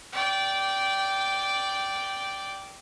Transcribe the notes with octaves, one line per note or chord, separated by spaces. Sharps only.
D5 G5